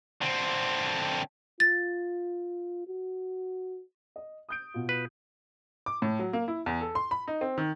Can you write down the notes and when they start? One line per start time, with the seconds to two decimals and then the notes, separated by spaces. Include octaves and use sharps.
0.21 D3 C4
1.60 F4 A6
2.87 F#4
4.16 D#5
4.49 D#6 G6 D7
4.74 B2 F4
4.89 B4
5.86 D6
6.02 A2
6.19 F#3
6.33 A#3
6.48 E4
6.66 E2
6.81 A4
6.95 C6
7.11 B5
7.28 D#4
7.41 C4
7.58 D#3